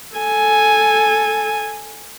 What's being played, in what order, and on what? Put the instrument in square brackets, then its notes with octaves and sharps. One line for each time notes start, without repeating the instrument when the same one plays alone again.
[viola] A4 G#5